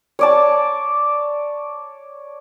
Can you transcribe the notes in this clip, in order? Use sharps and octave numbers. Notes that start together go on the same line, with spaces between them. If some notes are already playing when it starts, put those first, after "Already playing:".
C#5 D5 A5